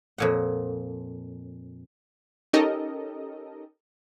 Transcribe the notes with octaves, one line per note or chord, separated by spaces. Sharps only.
F2 A#2 F#5
C#4 D#4 G4 A4 A#4 D#5